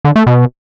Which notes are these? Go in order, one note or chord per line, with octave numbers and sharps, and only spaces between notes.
D3
A3
B2